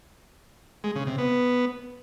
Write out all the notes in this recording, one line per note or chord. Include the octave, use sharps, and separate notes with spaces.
G#3
C#3
C3
B3